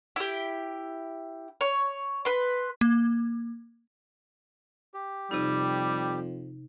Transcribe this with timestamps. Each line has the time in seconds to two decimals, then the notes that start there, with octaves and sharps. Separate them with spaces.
0.16 E4 G4
1.61 C#5
2.25 B4 C6
2.81 A#3
4.94 G4
5.31 F2 C3 G3 D#4